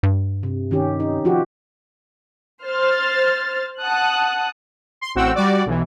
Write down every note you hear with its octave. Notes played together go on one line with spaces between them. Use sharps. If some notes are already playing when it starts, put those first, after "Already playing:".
G2
C3
D#3 C#4 G4
D#4
F3 F#4 G4
C5 F6 A6
F#5 A5 D#6 F#6
C6
A1 C4 F#4 F#5 G5 E6
G3 F#4 D5
B1 E3